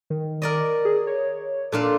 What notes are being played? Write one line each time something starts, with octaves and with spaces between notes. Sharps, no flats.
D#3
A#4 D5 D#5
G#4
C#5
A#2 D4 F4 A4